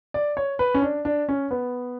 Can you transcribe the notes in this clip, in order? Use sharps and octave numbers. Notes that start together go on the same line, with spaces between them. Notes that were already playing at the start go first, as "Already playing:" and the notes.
D5
C#5
B4
C#4
D4
D4
C#4
B3